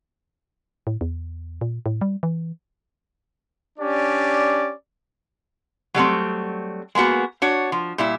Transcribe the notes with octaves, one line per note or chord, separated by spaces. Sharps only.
A2
E2
A#2
A2
G3
E3
C#4 D4 G4 D5
F#3 G3 A3 C4
G#3 A#3 B3 F#4
D4 F#4 C#5
F3
A#2 G3 E4